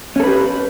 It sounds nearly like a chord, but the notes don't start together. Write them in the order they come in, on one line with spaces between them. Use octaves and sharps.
C#4 A4 B4 G4